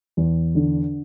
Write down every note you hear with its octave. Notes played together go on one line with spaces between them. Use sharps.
E2
D3